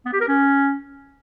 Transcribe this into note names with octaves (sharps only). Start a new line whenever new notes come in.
B3
G4
A#4
C#4